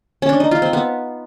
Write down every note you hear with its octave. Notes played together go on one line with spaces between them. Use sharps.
C#4
D4
D#4
F4
C4
B3